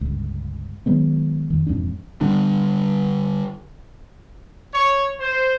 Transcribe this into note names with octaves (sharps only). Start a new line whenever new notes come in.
G1 C#2
D#3 F#3 G#3 B3
F2 D#3
E1 F2 G#2 D4
D3 G3 D4
C#5
C5